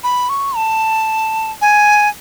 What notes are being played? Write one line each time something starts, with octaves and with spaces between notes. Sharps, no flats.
B5
C#6
A5
G#5